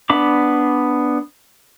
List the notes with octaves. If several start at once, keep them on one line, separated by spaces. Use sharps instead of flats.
B3 D4 B5 D6